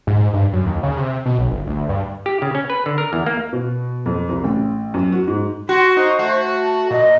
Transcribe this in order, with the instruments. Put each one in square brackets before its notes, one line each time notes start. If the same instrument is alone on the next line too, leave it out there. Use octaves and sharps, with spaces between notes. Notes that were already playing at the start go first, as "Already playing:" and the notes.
[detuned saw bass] G#2
G2
F#2
D#2
C#3
C3
B2
B1
G1
D2
G2
[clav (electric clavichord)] G4
C#3
C#4
B4
D3
A#4
E2
A#3
[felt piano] B2
F2
C2
A1
F#2
F#4
G#2
[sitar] F#4 [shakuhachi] C6
[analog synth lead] D#4 [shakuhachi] C5
[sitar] A3 [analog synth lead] F#4
[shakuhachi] A5
[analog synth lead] A#2 [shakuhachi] D#5